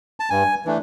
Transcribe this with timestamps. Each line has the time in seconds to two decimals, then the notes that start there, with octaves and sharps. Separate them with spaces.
0.20 A5
0.30 G2 G#5
0.65 E3 A3 D4